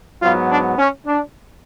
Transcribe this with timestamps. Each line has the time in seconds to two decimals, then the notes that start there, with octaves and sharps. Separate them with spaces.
0.21 G#2 F#3 B3 F4
0.50 D4
0.78 C#4
1.06 D4